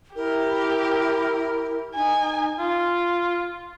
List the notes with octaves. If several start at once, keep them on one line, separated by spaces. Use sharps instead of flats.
E4 G4 A#4
D#4 G#5
F4